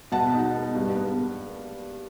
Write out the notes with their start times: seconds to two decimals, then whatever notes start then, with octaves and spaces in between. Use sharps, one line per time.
0.12 B2 F#5 A5
0.34 D#4
0.54 B3
0.75 G2
0.96 B3